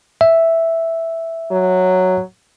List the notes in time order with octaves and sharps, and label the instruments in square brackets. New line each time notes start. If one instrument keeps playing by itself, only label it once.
[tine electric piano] E5
[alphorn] F#3